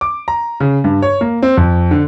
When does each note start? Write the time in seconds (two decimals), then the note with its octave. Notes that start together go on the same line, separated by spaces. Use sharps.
0.01 D6
0.28 A#5
0.60 C#3
0.84 G2
1.02 C#5
1.21 A#3
1.42 C4
1.57 F2
1.91 D3